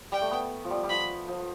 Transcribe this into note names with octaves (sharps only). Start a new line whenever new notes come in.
G3 G5
A3
B3
F3
G3
G3
F3 B5
F3